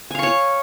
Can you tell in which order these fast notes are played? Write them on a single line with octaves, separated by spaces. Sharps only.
G#5 F5 C#6 C#5